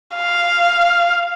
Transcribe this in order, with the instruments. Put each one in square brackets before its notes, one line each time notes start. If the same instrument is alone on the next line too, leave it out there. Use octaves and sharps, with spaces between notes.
[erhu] F5